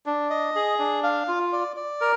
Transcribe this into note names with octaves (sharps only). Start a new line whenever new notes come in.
D4
D#5
G#4
D4
F5
F4
D5
D5
A#4